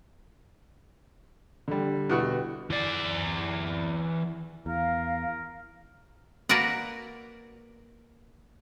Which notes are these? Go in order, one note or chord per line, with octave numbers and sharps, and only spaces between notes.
D3 G3
E2 B2 F#4
E3 D5
E2 A#4 F5
A#3 F#4 A#4 B4 D5 F#5